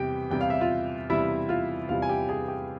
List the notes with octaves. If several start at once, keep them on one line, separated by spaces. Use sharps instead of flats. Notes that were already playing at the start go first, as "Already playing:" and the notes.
Already playing: E2 C3 G3 G4 G5
E2 C3 G3 G5
F5
E5
F4 F5
E2 C3 G3 E4 E5
F4 F5
E2 C3 G3 F4 F5
G#5
G4 G5
G#4 G#5
G4 G5